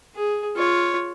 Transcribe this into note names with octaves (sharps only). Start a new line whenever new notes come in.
G#4
F4 C#5